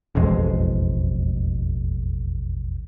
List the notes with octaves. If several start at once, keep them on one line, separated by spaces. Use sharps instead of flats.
E1 A1 F2 G#3